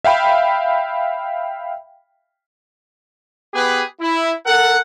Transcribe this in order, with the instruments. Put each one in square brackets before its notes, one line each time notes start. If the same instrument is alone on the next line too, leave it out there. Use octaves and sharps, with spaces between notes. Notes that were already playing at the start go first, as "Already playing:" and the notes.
[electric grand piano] E5 F5 G5 B5
[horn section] B3 G4 G#4 B4
E4
A4 A#4 F#5